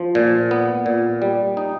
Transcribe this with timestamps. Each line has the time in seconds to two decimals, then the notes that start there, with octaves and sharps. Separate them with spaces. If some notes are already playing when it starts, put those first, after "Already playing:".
Already playing: F3
0.15 A#2
0.51 B3
0.86 A#2
1.22 G3
1.57 D#4